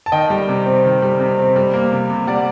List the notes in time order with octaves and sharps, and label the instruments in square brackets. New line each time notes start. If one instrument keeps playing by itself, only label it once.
[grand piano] A5
D#3 D#5 G5
G3
C3
C4
D#3
G3
C3
C4
G3
A#3
C3
C3
G3 D5 F#5